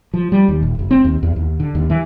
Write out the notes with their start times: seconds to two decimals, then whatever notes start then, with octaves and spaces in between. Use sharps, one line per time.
0.14 F3
0.32 G3
0.48 D#2
0.62 D#1
0.79 F#1
0.91 C4
1.04 D#2
1.23 E2
1.36 D#2
1.60 D3
1.75 D#2
1.90 E3